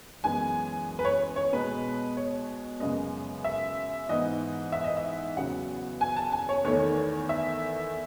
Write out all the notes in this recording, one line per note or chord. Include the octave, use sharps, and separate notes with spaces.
F#2 E3 G#3 B3 G#5
B4
C#5
C#5
B2 G#3 B3 B4
C#5
F#2 C#3 G#3 B3 D#5
E5
G#2 E3 B3 D#5
E5
D#5
E5
E2 C#3 F#3 B3 F#5
G#5
A5
G#5
C#5
E2 D#3 A3 C#5
E5